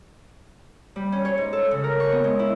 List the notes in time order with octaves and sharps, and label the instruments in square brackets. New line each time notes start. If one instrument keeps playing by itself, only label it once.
[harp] G3
C#4
C#5
G#2
A4
C#3
A#4
C#6
B3
G#3
E4